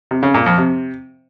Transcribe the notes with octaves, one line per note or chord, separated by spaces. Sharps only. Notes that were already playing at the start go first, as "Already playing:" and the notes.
C3
C#3
A#2
F2
C3